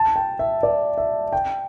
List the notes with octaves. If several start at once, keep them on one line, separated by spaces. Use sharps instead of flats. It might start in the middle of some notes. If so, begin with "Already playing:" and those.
Already playing: A5
G5
E5
D5
E5
G5